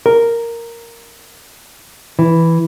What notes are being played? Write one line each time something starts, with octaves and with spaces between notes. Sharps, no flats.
A#4
E3